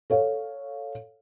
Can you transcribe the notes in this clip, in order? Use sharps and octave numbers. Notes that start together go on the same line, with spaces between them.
A4 C#5 F5